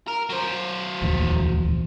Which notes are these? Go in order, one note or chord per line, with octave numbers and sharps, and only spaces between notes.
A#4
F#3 C5
D1 A#1 E2